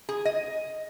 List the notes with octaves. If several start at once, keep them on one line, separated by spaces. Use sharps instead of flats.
G#4
D#5